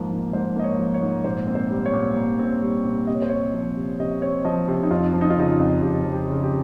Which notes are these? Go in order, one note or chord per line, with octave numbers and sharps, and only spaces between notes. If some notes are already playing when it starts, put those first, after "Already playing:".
Already playing: G#2 F3 A#3
G#2
G#2 C5
A#3 D#5
C#5
F3
C#5
G#2
A#2 C5
C4
C5
G3
C#5
A#2
A#2
C4
G3
A#2
C3 D#5
C#5
C5
C4 C#5
F3
C3
C3 D#5
C4 C#5
F3 D#5
C3
D#4
F2 F4
F3
D#4
F4
C#3 D#4
F4
F2
F2 G4
F3
G4
C#3
G4